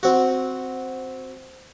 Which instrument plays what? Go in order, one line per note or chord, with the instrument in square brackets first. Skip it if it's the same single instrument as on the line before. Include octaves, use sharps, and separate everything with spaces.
[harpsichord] C4 F#4